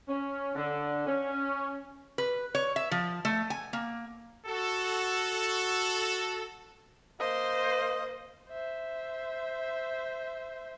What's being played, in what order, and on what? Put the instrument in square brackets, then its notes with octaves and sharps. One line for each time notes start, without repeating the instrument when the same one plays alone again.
[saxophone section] C#4
D3
C#4
[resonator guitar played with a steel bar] B4
C#5
E5
F3
A3
G#5
A#3
[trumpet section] F#4 A4
[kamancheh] A#3 C5 [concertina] D#5
[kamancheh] C5 E5